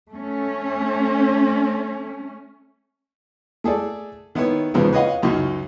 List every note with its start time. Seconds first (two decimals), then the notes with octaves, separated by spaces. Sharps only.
0.10 A3 C#4
3.64 A3 G#4 A4 D5
4.35 D#3 B3 E4 B4 C#5
4.74 E2 G#2 C#3 F3 B3 C4
4.93 B4 C#5 D#5 F5 F#5
5.22 C#2 F#2 D#4 C#6